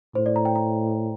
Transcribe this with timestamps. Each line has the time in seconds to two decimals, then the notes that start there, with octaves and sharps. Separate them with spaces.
0.15 A2 C5
0.26 D5
0.36 A#5
0.45 G5
0.56 A#5